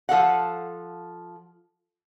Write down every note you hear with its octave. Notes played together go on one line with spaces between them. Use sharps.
F3 A4 F5 F#5